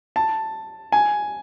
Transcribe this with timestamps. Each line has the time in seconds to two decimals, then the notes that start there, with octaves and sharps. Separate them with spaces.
0.16 A5
0.92 G#5